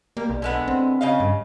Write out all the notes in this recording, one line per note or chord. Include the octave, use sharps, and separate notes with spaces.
G3 A#3
B1
D3 G#3 B3
C4
C#3 D#5 F5
G2